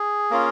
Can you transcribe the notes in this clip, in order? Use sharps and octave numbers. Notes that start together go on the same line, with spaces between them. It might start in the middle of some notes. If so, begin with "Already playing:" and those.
Already playing: G#4
A#3 C#4 F4